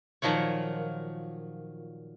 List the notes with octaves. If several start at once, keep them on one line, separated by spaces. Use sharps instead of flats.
A#2 D#3 F3 F#3 C#5